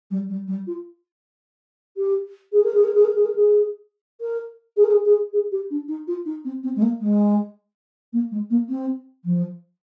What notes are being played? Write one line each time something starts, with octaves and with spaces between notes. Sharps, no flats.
G3
G3
G3
F4
G4
G#4
A#4
G#4
A#4
G#4
A#4
G#4
A#4
G#4
A#4
G#4
A#4
G#4
G#4
G#4
G4
D4
D#4
F4
D#4
C4
C4
G#3
A#3
G#3
A#3
G#3
A#3
C4
F3